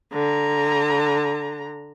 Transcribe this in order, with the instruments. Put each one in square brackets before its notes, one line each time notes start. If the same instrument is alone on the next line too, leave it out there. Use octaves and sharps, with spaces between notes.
[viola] D3 A#5